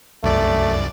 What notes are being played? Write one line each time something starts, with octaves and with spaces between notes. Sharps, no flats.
C2 F#2 A3 D5